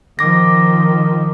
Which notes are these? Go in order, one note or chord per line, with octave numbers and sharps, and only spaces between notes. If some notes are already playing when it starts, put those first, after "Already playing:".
D#3 F3 D6 A#6